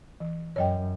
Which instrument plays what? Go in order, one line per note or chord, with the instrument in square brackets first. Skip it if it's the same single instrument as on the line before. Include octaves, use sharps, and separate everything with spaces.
[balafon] E3
[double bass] F#2 [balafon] C#5 D#5 G5